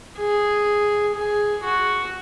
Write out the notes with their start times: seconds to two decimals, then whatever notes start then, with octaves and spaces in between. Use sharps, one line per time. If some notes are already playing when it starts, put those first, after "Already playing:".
0.18 G#4
1.14 G#4
1.64 F#4